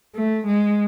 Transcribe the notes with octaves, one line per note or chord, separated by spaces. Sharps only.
A3
G#3